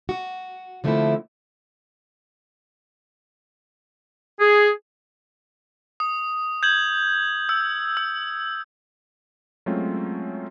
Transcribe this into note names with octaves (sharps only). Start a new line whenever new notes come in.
F#4
D3 F3 A3 A#3 C4 E4
G#4
D#6
G6 G#6 F#7
E6
E6
F#3 G#3 A3 C4 C#4 F4